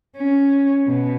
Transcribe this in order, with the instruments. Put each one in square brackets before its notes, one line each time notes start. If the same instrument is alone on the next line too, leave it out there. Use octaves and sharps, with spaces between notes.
[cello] C#4
B2